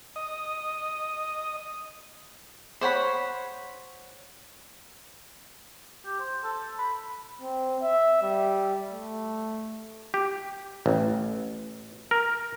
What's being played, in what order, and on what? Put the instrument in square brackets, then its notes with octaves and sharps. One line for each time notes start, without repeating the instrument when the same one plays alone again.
[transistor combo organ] D#5 D#6
[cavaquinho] C5 C#5 F#5 B5
[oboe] G4
C5
A4
B5
[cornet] C4
E5
G3
A3
[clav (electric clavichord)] G4
A1
A#4